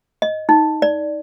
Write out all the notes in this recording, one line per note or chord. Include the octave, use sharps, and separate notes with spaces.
D#5
D#4
D5